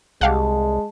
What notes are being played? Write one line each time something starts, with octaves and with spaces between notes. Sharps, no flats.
C2 G#3 G4 F5 F#5 A5